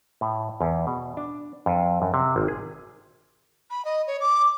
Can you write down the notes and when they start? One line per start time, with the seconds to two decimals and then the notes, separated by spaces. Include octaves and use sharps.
0.21 A2
0.61 E2
0.87 B2
1.17 D4
1.66 F2
2.02 F#2
2.14 C3
2.36 G#1
2.48 G#4
3.70 B5
3.85 D#5
4.07 C#5
4.20 D6